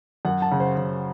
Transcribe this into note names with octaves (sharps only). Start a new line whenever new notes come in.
F#2 F#5
A5
C#3
C5
C#3